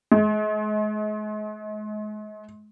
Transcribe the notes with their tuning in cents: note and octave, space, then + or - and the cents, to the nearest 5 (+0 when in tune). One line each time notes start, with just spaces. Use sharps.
G#3 +40